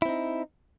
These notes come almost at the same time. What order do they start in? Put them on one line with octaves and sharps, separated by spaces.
E4 C4 D#4